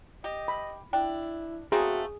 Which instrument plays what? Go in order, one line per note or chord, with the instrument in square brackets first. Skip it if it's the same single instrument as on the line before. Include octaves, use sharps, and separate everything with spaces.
[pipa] G4 [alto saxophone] D#5
[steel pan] B5
[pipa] D4 [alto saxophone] E4 [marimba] G5
[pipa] A3 A#3 C4 [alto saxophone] F#4 [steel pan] G#4